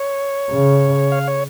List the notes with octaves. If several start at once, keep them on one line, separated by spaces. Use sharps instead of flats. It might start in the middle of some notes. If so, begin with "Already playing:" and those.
Already playing: C#5
C#3
F5
C#5